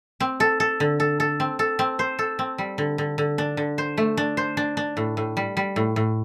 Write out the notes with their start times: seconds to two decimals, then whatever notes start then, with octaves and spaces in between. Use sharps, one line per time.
0.20 C4
0.40 A4
0.60 A4
0.80 D3
1.00 A4
1.20 A4
1.40 C4
1.59 A4
1.79 C4
1.99 C5
2.19 A4
2.39 C4
2.58 G3
2.78 D3
2.98 D3
3.18 D3
3.38 D4
3.57 D3
3.78 C5
3.98 A3
4.17 D4
4.37 C5
4.57 D4
4.77 D4
4.97 A2
5.17 A2
5.37 G3
5.57 G3
5.76 A2
5.96 A2